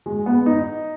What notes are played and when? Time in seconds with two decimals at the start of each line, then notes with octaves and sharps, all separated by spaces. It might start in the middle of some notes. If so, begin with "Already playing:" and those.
0.06 G#3
0.26 B3
0.46 D#4